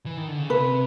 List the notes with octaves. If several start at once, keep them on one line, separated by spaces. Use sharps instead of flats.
E3
D#3
D3
C#3
C3 B4